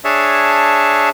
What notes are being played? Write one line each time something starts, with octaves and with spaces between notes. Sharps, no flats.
D4 G#4 C#5 E5 A5